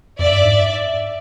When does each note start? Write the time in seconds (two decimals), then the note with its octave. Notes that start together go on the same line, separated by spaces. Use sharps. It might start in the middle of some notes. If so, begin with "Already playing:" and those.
0.19 F2 D5 E5
0.31 G2
0.44 G#2